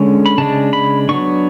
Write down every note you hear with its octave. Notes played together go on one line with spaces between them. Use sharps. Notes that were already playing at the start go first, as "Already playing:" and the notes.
Already playing: D3 G#3 C#4
B5
C#3 G#3 D4 A5
B5
F#3 B3 D4 C#6